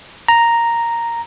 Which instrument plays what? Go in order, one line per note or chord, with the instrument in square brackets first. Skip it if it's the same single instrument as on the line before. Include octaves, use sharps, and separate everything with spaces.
[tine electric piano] A#5